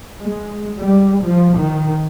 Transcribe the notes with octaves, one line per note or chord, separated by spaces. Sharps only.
G#3
G3
F3
D#3